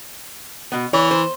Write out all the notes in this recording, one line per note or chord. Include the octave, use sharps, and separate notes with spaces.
B2 B3
E3 C#5
C5